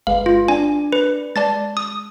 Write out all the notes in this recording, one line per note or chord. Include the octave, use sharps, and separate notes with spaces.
G1 G#3 B4 F5
F4
D4 D5 G#5
B4
G#3 D5 A5 A6
D#6